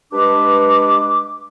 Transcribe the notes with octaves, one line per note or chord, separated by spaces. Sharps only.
G2 G#3 D4 B4 D6